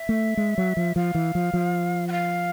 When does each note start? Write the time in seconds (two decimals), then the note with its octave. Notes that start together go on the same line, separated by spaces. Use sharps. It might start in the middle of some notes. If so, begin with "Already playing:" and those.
Already playing: E5
0.09 A3
0.37 G#3
0.58 F#3
0.77 F3
0.96 F3 F5
1.15 E3
1.35 F3
1.54 F3
2.08 F#5
2.12 F5